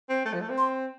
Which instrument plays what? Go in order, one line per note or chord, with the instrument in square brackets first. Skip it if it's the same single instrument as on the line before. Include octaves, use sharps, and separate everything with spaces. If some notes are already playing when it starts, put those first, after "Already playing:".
[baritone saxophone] C4
A3
F3
A3
C4
[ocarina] C6